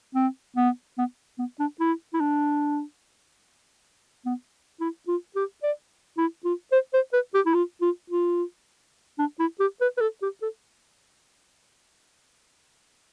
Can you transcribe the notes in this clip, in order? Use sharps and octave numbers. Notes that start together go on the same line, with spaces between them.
C4
B3
B3
B3
D4
E4
E4
D4
B3
E4
F4
G4
D5
E4
F4
C5
C5
B4
G4
E4
F4
F4
F4
D4
E4
G4
B4
B4
A4
G4
A4